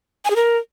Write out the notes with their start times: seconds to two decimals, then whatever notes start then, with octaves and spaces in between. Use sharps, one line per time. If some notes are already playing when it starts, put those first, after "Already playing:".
0.25 G#5
0.30 G#4
0.36 A#4